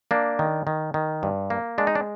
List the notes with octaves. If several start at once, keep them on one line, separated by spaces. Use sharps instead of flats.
A#3 D4
D#3
D#3
D#3
G2
A#3
G#3 D4
D#4
D4